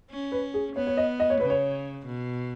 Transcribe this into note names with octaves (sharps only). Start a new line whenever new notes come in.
C#4
B4
G#4
B3 C#5
C#5
D#5
D#5
C#5
C#3 B4
C#5
B2